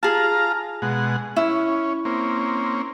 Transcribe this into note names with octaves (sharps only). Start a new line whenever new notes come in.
F4 G#4 F5 A5 A#5
B2 G#3 F#5
C#4 E4
A#3 C4 C#4